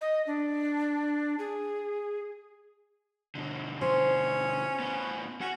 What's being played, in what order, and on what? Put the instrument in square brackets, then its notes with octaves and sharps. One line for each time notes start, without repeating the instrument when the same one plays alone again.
[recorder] D#5
D4
G#4
[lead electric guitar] B2 D3
[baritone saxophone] C#4 [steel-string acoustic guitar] C5
[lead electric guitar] A2 B3
[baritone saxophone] C#4 [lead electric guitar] F#4 F#5